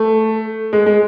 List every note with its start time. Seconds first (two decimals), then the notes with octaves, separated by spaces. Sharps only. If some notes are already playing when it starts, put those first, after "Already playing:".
Already playing: A3
0.73 G#3
0.86 G#3